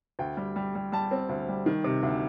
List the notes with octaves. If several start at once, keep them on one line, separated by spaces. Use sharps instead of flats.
D2 G5
G3
G3
G3
G3 A5
C4
D2
G3
D#3
C3
D2